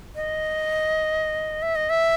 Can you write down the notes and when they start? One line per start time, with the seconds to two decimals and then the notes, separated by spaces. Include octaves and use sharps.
0.15 D#5
1.62 E5
1.75 D#5
1.90 E5